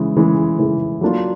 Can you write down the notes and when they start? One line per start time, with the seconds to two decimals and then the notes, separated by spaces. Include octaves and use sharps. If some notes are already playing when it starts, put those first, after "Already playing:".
Already playing: C#3 E3 G#3
0.16 C#3 E3 G#3
0.59 C#3 E3 G#3
1.01 F#3 A#3 D4 F4